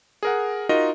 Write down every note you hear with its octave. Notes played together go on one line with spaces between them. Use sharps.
G#4 A#4 F#5
D#4 F4 F#4 A#4 D#5